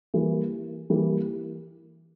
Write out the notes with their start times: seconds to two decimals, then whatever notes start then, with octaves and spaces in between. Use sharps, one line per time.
0.14 E3 G3 A#3
0.90 E3 G3 A#3